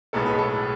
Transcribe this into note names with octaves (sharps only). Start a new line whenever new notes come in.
B1 A2 G#3 B3 A4
B4
A4